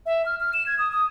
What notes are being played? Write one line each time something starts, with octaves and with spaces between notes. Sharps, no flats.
E5
F6
F6
E7
G#6
D#6
D#6